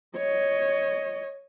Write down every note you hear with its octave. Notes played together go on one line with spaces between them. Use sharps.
C#5 D#5